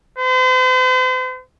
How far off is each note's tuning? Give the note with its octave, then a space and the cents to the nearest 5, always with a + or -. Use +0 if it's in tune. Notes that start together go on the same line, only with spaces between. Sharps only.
C5 -45